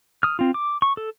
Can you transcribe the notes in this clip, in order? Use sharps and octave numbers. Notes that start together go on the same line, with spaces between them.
D#6 F6
C4 F4
D6
C#6
A4